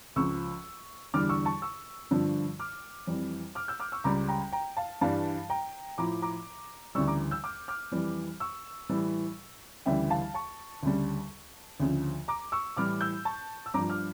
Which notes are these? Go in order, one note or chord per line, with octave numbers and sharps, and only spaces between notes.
C#2 C#3 F3 C#6 E6
E2 D3 G3 D6 F6
C#6 E6
A5 C#6
C#6 E6
G2 D3 F3
D6 F6
F2 E3 G3
D6 F6
E6 G6
D6 F6
C#6 E6
C#2 C#3 G3 A#5 D6
G5 A#5
G5 A#5
F5 A5
G2 E3 G3 F5 A5
G5 A#5
A2 F3 A#5 D6
A#5 D6
D2 C#3 E3 G3 C#6 E6
A#5 D6
E6 G6
D6 F6
D6 F6
F2 E3 G3
C#6 E6
A2 E3 G3
D2 C#3 E3 G3 E5 G5
F5 A5
A5 C#6
D2 C#3 G3
D2 C#3 F3
A#5 D6
C#6 E6
A2 E3 G3 D6 F6
E6 G6
A5 C#6
E6
G2 F3 A#5 D6
D6 F6